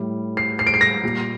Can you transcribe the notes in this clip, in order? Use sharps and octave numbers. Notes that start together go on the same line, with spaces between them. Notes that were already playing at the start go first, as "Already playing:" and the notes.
Already playing: A2 G3
C7
C7
D7
C7
A#6
A#2 G3